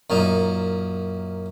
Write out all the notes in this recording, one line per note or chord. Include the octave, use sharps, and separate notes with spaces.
F#2 A#2 D#4